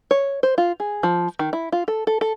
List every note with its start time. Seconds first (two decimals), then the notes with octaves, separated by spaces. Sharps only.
0.11 C#5
0.43 C5
0.58 F4
0.80 G#4
1.03 F3
1.39 D#3
1.53 E4
1.72 F4
1.88 A4
2.07 A4
2.21 A4